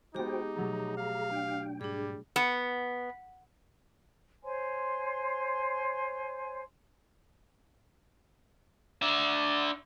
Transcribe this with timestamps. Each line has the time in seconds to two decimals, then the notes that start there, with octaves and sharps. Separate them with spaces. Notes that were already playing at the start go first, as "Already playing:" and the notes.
0.15 G#3 B3 D#4 F#4 G4 C5 G5 D6
0.56 B2 F#3 A3 G#4 A#5
0.98 F5
1.31 D4 G5
1.81 G#2 G3 D4 G#4
2.36 B3
4.43 C5 C#5 G#5 C6
9.02 D4 E5